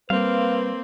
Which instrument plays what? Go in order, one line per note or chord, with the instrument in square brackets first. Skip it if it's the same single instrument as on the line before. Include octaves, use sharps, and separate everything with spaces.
[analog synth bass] G3 [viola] A#3 C4 [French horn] B4 [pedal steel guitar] F5